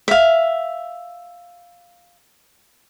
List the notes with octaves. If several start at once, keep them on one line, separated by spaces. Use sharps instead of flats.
E5 F5